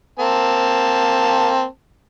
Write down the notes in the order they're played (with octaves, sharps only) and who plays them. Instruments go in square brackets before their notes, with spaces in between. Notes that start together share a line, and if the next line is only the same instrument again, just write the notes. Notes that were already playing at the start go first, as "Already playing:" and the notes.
[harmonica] A#3 C4 A5